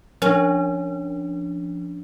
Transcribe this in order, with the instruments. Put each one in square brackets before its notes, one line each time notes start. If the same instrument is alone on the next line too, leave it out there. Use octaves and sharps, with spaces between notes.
[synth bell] F3 D4 [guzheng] C#4